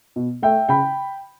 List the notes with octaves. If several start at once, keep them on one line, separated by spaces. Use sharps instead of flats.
B2
A3 E5 G5
C#3 G5 B5